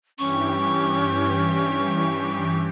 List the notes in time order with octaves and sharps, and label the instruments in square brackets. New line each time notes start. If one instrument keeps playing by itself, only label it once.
[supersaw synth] G2 E3 G4 [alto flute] C#4 [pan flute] C#6